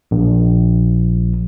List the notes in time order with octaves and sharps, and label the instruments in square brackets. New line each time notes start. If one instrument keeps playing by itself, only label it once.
[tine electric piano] A#1